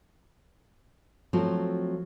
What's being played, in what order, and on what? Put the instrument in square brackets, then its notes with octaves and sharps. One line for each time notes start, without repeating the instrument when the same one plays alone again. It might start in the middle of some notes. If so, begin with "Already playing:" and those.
[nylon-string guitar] F3 F#3 A3 C4 F#4